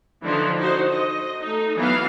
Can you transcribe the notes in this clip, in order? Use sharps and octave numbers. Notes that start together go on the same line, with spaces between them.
D3 E3 F3 D4 D#4
D#4 F#4 C5
D#5
A3 D#4
E3 F#3 B3 F5